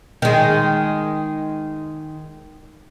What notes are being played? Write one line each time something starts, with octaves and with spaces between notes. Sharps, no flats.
D#3 G#3